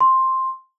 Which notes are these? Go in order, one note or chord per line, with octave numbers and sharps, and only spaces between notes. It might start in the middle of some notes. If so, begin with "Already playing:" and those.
C6